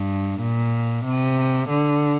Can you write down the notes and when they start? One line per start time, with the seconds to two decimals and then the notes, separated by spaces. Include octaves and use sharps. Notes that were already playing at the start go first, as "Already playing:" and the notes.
Already playing: G2
0.41 A#2
1.06 C3
1.70 D3